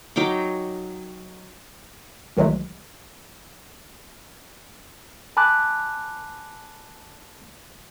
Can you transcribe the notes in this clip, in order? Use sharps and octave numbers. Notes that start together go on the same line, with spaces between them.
F#3 D#4 G5 D6
C2 D#3 E3 F#3 G#3 A3
G#5 A5 B5 D6 F#6